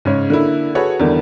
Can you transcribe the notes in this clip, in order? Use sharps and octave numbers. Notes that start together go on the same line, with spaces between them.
G#2 C#3 C#5
D3 A#3 E4
F#4 G#4 A4 B4 C#5 F#5
E2 D3 D#3 G3